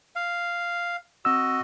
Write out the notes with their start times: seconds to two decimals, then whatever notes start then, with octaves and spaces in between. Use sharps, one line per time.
0.16 F5
1.25 C4 F#4 D#5 E6